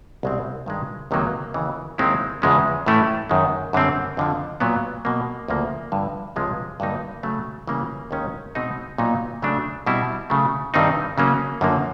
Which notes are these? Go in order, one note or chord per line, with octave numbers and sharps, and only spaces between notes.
C2 B2 G#3 C4
G2 D#3 G#3
C#2 C3 D#3 F#3 A#3
D#2 C#3 E3
D#2 D#3 G#3 C4 E4
E2 C#3 F3 G#3 C#4
A2 E3 A3 C#4 E4
F#2 D#3 G#3
F#2 D3 G3 C4
F2 D3 F3
A#2 F#3 B3
B2 F#3 A#3
D2 C#3 F3 A#3
G2 D3 F3
C#2 C3 F3 G#3
G2 D3 F#3 A#3 D#4
C#3 F#3 A3
C#3 E3 G3 A#3 C#4
D#2 D#3 G#3 C#4
B2 G#3 C4 D#4
A#2 F#3 B3 D#4
C#3 F#3 A3 D4
B2 G3 C4 E4
C#3 F#3 A3
G2 D#3 G3 C4 D#4
C#3 F#3 A#3 C#4
F#2 D3 F3 A#3